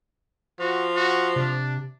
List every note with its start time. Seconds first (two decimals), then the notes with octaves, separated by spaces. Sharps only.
0.59 F3 F#4
0.96 F#4
1.36 C3 D4